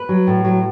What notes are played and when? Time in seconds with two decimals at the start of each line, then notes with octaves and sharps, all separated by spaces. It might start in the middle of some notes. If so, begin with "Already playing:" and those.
Already playing: B4
0.09 F#3
0.27 A2
0.44 F#3